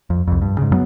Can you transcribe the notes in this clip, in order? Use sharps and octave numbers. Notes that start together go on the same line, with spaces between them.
F2
C2 F2
G2
G#2 C#3
F#2 F#3 B3